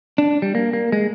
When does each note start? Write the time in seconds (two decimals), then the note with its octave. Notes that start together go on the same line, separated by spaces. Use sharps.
0.18 D4
0.42 G3
0.55 A#3
0.73 A#3
0.92 G#3